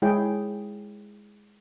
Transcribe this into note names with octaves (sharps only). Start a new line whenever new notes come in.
G#3 E4 G#4 C#5 G5